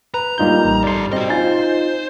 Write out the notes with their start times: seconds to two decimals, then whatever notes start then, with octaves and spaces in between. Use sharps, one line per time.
0.14 B4 A#5
0.38 G3 A#3 D#4 F4 G4 G6
0.65 A1
0.84 G2 A4 D5 C6
1.13 C4 F#4 D#5
1.30 D#4 F4 C5 G#5 A6